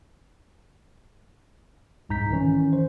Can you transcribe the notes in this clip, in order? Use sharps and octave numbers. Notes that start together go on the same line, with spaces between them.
C2 G#2 A#5 G6 B6
D#3 E3 C#4
C5